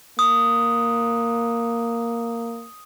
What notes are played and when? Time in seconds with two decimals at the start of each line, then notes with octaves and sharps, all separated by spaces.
0.19 A#3 D#6